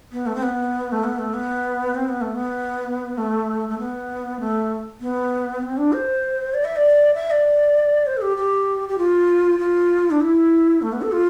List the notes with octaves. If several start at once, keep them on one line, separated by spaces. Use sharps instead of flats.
B3
A3
C4
B3
A3
B3
A3
B3
C4
B3
A3
B3
A3
A3
B3
A3
B3
C4
D4
C5
D5
E5
D5
E5
D5
C5
A4
G4
G4
G4
F4
F4
D4
E4
A3
B3
A4
F4